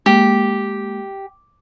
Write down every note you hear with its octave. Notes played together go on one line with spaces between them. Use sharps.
G#3 A#3 G4